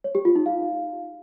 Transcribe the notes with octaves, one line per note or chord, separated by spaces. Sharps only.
C#5
G4
F4
D#4
F5